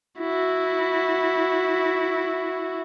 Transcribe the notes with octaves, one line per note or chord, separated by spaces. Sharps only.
E4 F#4